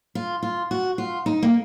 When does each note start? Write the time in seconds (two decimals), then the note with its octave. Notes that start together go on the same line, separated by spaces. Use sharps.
0.15 F4
0.43 F4
0.71 F#4
0.98 F4
1.26 D#4
1.43 A#3